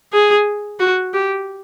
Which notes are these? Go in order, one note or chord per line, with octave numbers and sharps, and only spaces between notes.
G#4
F#4
G4